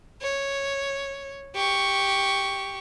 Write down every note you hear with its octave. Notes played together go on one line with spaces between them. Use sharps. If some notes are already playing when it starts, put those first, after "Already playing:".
C#5
G4 C#6